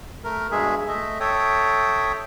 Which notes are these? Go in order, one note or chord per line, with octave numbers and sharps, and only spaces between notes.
A3 A#4
G2 B2 G#3 G#4 E5
A3 D#5 E5
A4 C#5 E5 G5 D#6